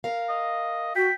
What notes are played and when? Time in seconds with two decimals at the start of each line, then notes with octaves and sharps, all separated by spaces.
0.04 A#4 F5
0.29 D#5
0.96 F#4 G5 B6